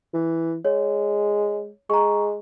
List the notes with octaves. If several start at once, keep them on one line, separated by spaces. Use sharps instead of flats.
E3
G#3 C#5
G#3 A#5 C#6